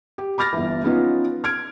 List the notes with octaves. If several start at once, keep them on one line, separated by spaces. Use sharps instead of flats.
G4
B5 D6 F6 A6 A#6
G1 E3
F3 B3 C#4 D#4 F4
F6 G#6 D7